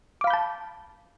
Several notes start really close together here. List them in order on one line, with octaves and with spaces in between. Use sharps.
D6 F5 B5 G6 A5